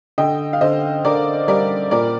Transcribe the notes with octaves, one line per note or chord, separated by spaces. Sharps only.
D3 D#5 G5
F5
D3 C5 D#5
D3 A#4 D5
G3 A#4 D5
A#2 A#4 D5